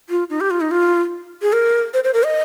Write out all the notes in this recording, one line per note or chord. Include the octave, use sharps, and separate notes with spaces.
F4
D#4
G4
F4
D#4
F4
G#4
A#4
C5
C5
A#4
D#5